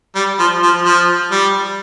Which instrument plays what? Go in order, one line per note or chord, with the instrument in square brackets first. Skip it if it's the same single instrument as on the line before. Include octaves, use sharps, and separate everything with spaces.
[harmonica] G3
F3
F3
F3
G3